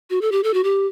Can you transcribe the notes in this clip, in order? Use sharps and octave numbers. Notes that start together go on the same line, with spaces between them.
F#4
A4
G4
A4
F#4
G4